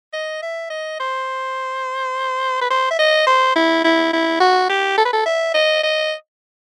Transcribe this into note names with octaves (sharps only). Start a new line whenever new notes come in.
D#5
E5
D#5
C5
B4
C5
E5
D#5
C5
E4
E4
E4
F#4
G4
A4
B4
A4
E5
D#5
D#5